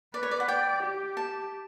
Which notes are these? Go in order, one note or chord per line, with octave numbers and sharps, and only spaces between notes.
B4 D5
C#5
D5
F#5
D5 G5
G4
A5